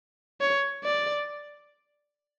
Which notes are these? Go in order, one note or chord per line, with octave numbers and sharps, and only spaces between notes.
C#5
D5